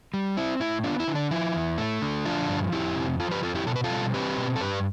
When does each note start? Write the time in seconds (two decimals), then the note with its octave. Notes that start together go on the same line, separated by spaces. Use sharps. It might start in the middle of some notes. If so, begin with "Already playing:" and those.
0.14 G3
0.37 C4 E4
0.60 A2 E4
0.84 B3 D4 F4
1.00 E4
1.08 D3
1.15 D4
1.31 F3 E4
1.55 E2
1.78 A3
2.02 D3
2.25 F3 D4 F4
2.48 G2
2.72 F2 E4 G4
2.96 C3
3.20 F3 F4 A4
3.31 G4 B4
3.43 F2 F4 A4
3.55 E4 G4
3.67 B2 A4
3.76 B4
3.84 F4 A4
3.90 G3
4.14 C4 G4 B4
4.38 B2
4.56 A4
4.61 G2 G4 B4